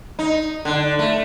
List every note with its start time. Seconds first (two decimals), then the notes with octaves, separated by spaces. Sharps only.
0.19 D#4
0.65 D3
0.99 A3